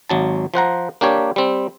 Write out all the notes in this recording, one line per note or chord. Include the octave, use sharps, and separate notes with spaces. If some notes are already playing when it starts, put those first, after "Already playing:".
G#1 F#3 A5
F3 C5 F#5 A#5
A#3 D4 G4 C#5
G3 C4